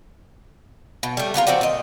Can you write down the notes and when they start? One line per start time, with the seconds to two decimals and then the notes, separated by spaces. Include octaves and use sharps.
1.03 B2
1.17 G3 A3
1.34 B3 D4 F4 A#4
1.47 F3 C4 F#4 D5
1.61 A#2 D#5